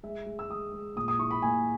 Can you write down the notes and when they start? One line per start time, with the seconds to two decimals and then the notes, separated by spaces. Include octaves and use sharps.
0.03 G#3 E5
0.26 G#3
0.39 E6
0.50 G#3 D#6
0.72 G#3
0.96 A#2 D#6
1.08 D#6
1.19 E4 C#6
1.31 B5
1.42 A#3 G#5